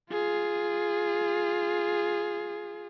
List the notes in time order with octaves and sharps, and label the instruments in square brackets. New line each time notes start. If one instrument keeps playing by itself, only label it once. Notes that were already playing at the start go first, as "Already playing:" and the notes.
[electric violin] F4 G#4